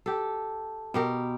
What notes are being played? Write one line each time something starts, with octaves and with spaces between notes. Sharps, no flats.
G4 A4
B2 G4 A#4